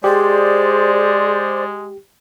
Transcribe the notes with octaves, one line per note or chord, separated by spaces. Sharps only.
G#3 G4 G#4 C5 D5